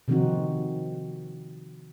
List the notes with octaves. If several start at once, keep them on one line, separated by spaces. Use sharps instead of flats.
C3 D#3 F3 C4 D#4 F#4